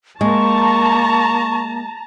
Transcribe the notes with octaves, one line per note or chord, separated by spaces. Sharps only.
G#3 A#3 A5 A#5 C#6